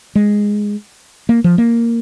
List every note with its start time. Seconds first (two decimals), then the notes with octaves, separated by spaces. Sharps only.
0.15 G#3
1.29 A#3
1.44 F3
1.58 A#3